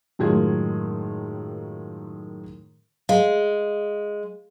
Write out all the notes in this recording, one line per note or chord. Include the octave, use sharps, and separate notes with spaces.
F#2 A2 D#3 G#3 F4 G#6
G#3 F5